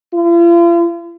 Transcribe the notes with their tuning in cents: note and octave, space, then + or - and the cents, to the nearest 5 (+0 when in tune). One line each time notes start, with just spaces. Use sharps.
F4 -45